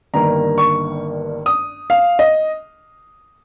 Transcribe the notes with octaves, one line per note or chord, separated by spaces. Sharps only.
G1 G2 D#3 A#3 A#5
C#6
D#6
F5
D#5